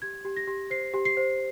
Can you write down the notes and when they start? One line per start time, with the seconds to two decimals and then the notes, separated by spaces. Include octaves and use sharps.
0.02 G4 G#6
0.25 G4
0.36 A#6
0.47 G4
0.70 C5 C7
0.94 G4
1.05 C7
1.17 C5